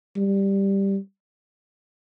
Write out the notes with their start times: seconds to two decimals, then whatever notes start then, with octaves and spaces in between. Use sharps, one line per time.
0.16 G3